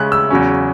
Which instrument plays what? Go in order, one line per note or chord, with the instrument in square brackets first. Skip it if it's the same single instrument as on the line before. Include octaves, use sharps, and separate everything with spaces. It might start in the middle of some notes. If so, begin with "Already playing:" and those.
Already playing: [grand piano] C#3 G#3 C#4 F#6
E6
E2 C#3 F#3 C#4